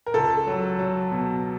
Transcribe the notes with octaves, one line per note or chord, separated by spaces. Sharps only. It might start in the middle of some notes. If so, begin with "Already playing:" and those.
A#4
C#2 A4
F#3
F#3
B2